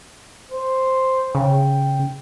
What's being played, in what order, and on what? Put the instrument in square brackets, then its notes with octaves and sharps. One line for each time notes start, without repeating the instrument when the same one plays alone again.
[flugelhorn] C5
[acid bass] C#3 [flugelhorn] G5